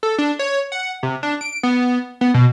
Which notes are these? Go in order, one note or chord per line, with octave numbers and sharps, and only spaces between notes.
A4
D4
C#5
F#5
C3
D4
D7
B3
B3
B2